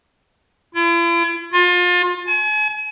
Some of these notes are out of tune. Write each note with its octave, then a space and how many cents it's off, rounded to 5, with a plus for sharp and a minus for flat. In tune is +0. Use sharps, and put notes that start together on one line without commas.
E4 +45
F4 +30
G#5 +40